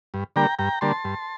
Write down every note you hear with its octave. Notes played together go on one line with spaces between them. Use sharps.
G2
D3 G3 A#3 G5 A#5
G2 G5 A#5
D3 G3 A#3 A5 C6
G2